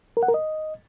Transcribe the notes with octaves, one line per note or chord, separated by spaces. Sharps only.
A#4
F#5
A#4
D#5